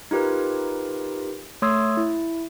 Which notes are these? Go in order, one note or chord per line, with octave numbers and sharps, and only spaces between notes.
D#4 F4 G4 A#4 B4
A3 C#5 C6 D#6 E6 G#6
E4